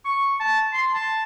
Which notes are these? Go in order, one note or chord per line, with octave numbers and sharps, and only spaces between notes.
C#6
A5
C6
A5